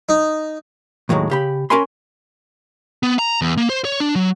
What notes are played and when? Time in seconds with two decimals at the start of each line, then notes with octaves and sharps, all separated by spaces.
0.09 D#4
1.09 D#2 A2 D#3 F#3 G#3
1.30 C#3 G4 B5
1.70 C#4 F#4 A#4 G#5 B5 C6
3.03 B3
3.19 A#5
3.41 E2
3.57 A#3
3.70 C5
3.85 C#5
4.00 D4
4.15 F#3